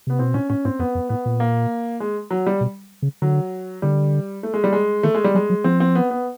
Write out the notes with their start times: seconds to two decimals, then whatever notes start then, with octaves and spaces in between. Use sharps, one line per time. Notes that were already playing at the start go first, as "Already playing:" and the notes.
0.07 C3 B3
0.19 B2 C4
0.34 A#2 C#4
0.50 A2 C#4
0.65 G#2 C4
0.79 F2 B3
0.95 F2
1.09 A2 B3
1.26 A#2
1.40 A#3
2.00 G#3
2.31 F#3
2.47 G3
2.61 B2
3.02 C#3
3.22 D3 F#3
3.82 D3 G3
4.43 A3
4.54 G#3
4.64 G3
4.73 G#3
5.03 D#3 A3
5.15 G#3
5.24 G3
5.34 F#3 G#3
5.50 F#3
5.64 F3 C4
5.80 C4
5.95 B3
6.11 B3